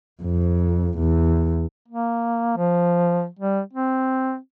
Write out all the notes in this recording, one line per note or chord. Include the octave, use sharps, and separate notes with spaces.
F2
E2
A#3
F3
G3
C4